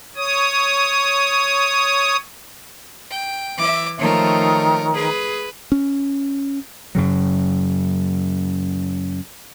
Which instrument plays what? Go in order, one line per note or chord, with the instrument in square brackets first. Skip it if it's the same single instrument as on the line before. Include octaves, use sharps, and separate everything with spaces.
[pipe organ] C#5 D#6
[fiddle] G5
[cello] E3 [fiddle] E5 D6
[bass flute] D#3 [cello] F3 A3 [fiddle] A#4 C#5
[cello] G#4 [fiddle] B4
[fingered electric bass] C#4
[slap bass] F#2 C#3 F#3